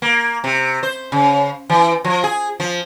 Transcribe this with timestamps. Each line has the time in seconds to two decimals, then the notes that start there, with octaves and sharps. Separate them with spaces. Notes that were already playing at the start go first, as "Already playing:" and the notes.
0.02 A#3
0.44 C3
0.83 C5
1.12 C#3
1.70 E3
2.04 F3
2.24 G#4
2.60 F3